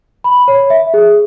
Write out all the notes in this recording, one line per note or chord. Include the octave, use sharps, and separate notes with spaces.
B5
C#5
E5
G#4